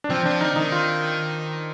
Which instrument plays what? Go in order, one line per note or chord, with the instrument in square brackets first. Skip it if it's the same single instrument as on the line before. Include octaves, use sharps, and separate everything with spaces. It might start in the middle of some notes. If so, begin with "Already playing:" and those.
[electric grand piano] D4
[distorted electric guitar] F3 [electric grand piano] C4
[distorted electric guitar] F3 [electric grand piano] D4
[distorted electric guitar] D#3 [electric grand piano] D#4
[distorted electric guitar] D#3 [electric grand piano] D#4
[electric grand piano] F4